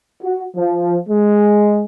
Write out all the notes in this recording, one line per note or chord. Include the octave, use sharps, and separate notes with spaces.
F#4
F3
G#3